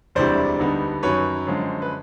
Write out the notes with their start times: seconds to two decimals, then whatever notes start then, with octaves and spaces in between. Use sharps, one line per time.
0.15 E1 D2 C3 E3 G3 C5 D5
0.60 D2 D3 G3 B3 D#4
1.03 F#2 D#3 F#3 B4 C#5
1.47 F#2 D3 F3 G#3
1.82 B4